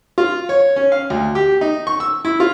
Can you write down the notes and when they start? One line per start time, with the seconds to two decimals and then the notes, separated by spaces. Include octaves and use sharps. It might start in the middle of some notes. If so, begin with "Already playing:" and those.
0.18 F4
0.49 C#5
0.76 C#4
0.92 F5
1.10 D2
1.35 G4
1.61 D#4
1.87 C#6
2.00 E6
2.25 E4
2.40 F4